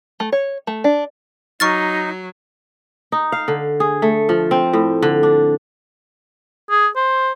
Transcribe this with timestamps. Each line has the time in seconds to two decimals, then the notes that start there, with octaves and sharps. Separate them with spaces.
0.20 A3
0.32 C#5
0.67 A3
0.84 D4
1.60 F#3 D#4 C#6 F6 A6
3.12 D#4
3.32 F5
3.48 D3
3.80 G#4
4.02 A3
4.29 F3
4.51 C4
4.73 A2
5.02 D3
5.23 D4
6.70 G#4
6.96 C5